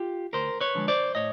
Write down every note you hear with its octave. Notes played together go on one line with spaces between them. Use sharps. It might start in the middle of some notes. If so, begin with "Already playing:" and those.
Already playing: F4 G4
D2 A#4 C5
B4 C#5
D3 F3 G#3
C5 D5
A2 C#5 D#5